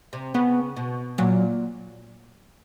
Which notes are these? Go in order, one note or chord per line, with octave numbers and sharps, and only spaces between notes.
C3
C#3 B3
B2
A#2 F#3